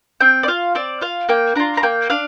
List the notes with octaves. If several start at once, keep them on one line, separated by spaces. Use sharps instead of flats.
C4 G5
D5
F4 F5
C4 D5
F4 F5
A#3 G5
D4 F4 A#5
A#5
A#3 G5
D4 F5